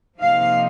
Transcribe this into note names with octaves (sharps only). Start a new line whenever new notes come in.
C3 F3 A#3 D#4 F5